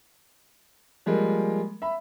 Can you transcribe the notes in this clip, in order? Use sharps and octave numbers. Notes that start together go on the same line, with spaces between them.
F3 G3 G#3 A#3
E5 B5